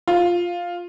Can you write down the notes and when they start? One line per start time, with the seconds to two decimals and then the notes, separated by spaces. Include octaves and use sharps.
0.08 F4